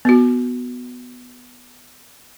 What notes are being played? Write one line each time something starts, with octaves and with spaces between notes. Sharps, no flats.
B3 F#4